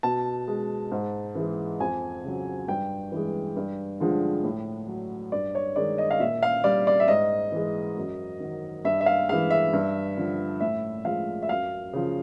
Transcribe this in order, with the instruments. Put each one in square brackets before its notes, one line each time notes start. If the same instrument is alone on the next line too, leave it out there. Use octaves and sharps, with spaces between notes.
[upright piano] B2 A5
G#3
G#2
E3 G#3
F2 G#5
C#3 F#3
G2 G5
E3 G#3
G2
D3 F3 G#3
A2
F#3
G2 D5
C#5
D#3 G#3 D5
D#5
F5
A#2 E5
F5
G3 D5
D5
E5
G#2 D#5
E3 G#3
F#2
D#3 F#3
G2 E5
E5
F5
E3 G#3 F5
E5
G2
D3 F3
A2 E5
F3 G#3 F5
E5
F#2 F5
C#3 F3